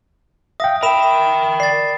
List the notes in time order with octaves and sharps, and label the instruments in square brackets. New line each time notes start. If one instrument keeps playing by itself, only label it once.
[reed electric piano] E5 F5 G5 [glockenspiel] D#6 A#6
[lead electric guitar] A#4 G5 [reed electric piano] E5 [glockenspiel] B5 E7
[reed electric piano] D5 [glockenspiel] A6 C7